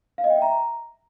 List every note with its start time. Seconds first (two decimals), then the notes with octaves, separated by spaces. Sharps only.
0.18 F5
0.24 D#5
0.30 G5
0.36 E5
0.42 A#5